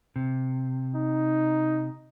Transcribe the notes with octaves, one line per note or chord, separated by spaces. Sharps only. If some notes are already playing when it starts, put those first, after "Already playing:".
C3
D#4